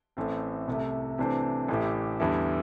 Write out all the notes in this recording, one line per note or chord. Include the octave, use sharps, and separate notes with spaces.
A1 A2 A3 C4
C2 C3 A3
C3 E3 A3 D4 C5
A1 A2 A3 E4 G4
E2 D3 G3 E4 A4